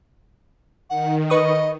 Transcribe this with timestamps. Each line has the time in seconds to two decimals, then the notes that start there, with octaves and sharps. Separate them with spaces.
0.89 D#3 F#5
1.30 B4 D#5 C#6 D#6